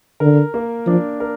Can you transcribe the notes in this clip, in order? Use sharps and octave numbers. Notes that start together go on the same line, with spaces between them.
D3 A#4
A#3
F3 D4
A#4